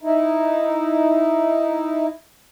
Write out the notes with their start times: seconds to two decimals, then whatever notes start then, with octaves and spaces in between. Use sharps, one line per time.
0.02 D#4 E4